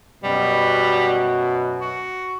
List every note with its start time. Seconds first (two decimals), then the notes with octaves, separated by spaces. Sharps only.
0.24 F#2 B2 G3
1.81 F#4